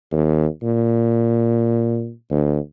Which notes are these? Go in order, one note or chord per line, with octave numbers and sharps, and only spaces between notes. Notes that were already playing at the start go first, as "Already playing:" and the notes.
D#2
A#2
D2